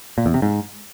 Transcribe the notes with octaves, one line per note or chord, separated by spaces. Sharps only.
A#2
E2
C3
G#2